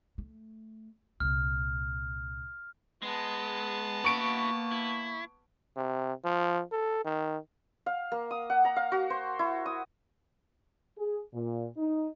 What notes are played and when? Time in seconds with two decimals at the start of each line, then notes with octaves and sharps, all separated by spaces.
0.18 A3
1.20 C2 A#2 F6
3.02 G#3 B3 A5
4.04 A#3 E4 F#4 C#6 D7
4.72 E4
5.77 C3
6.24 F3
6.72 A4
7.05 D#3
7.86 F5
8.12 A#3
8.31 D#6
8.50 F#5
8.65 A#5
8.76 F5
8.92 F#4
9.10 C5
9.39 E4
9.66 D#6
10.98 G#4
11.34 A#2
11.77 D#4